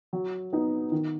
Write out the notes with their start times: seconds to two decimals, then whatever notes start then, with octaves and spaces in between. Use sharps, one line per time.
0.13 F#3
0.53 B3 D#4
0.92 D#3